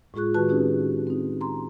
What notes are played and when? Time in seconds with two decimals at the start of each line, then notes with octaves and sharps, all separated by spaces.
0.14 A2 G#3 F4 G#4 C#6 F#6
0.34 D#3 F#4 G#4 B4 A5 F#6
0.49 C4 C#4 D#4 E4 G4 G#4
1.07 C4 D#4
1.41 A#5 C6